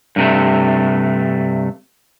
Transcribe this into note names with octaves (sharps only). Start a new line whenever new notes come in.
G2 C3 A3